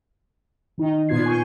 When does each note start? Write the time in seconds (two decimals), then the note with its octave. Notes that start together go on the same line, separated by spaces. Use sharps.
0.78 D#3 D#4
1.09 A#2 B3 F4 G#6 C7
1.26 G#5 C#6 G6